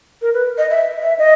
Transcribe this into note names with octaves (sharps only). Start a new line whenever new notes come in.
A#4
B4
D#5
E5
E5
D#5